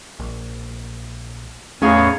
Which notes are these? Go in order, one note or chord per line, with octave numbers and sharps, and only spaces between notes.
A#1
E2 A2 D#3 C#4 G#4 C#5 F5